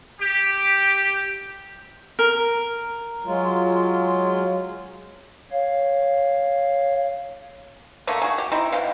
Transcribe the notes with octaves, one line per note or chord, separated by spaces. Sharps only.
G4
A#4
F#3 G#3 F4
C#5 F5
D3 A3 A#3 F5
F#4 G#4
G4
C4 D#4 E4
B2 F5 G5